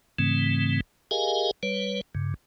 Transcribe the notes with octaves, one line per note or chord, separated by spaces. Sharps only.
G#2 C#3 E3 A3 C4
G4 G#4 A#4 D#5 F5 G#5
G3 B4 C#5
G2 C#3